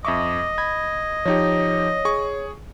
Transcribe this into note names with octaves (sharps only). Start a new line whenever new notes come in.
F2 D#5 E5 C#6 D6
B5 G#6
F3 D#4 G4 C#5
G#4 C#6